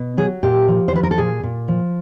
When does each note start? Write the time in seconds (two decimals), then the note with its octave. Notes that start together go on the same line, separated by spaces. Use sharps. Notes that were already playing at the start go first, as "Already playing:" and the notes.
Already playing: B2
0.17 F#3 G#4
0.43 A#2 G4
0.68 F3
0.88 C5
0.93 F3 B4
1.03 A#4
1.11 A4
1.18 A#2 G#4
1.43 A#2
1.68 F3